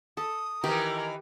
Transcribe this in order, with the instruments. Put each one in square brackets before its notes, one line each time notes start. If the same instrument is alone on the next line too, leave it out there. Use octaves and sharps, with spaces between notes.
[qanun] A4 [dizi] D#6
[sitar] D#3 E3 [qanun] G4 [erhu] A#4